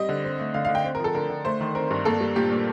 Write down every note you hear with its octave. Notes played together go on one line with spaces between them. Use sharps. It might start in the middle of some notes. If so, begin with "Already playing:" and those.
Already playing: G3 C4 D#5
D3
C4
A3
D3 F5
D3 F5
G5
C4
F3 A#4
A4
D3 A#4
D3
A3 C5
D#3
C4 A#4
G2
A#3 A4
G3
A#2 G4
A#2